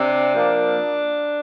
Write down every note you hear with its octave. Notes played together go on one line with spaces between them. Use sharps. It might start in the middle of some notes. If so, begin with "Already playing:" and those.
Already playing: C3 D4
F3 A#3